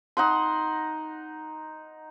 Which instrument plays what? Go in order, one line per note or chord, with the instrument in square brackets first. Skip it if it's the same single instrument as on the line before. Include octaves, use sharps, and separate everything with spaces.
[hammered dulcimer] D#4 F#5 C6